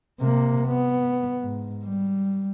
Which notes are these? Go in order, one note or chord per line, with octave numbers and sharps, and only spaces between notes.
C3 A#3
B3
G#2
G3